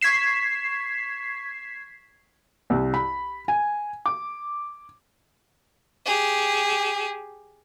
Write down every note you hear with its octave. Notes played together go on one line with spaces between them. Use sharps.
C#6 G#6 B6 C7 E7
C2
B5
G#5
D6
G4 G#4